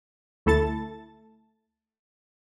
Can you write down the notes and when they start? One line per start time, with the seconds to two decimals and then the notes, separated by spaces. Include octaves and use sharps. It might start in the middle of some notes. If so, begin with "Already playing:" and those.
0.46 D2 A3 E4 A4 A5 A6